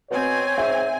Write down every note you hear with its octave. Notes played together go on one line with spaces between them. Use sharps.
B2 C4 C#5 G#5
G#2 E5